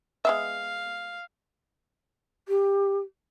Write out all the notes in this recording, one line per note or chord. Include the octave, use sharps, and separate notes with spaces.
G#3 B3 E5 F5
G4